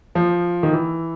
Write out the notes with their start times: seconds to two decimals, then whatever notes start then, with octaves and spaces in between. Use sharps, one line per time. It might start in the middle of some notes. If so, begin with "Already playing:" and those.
0.15 F3
0.63 D#3
0.73 E3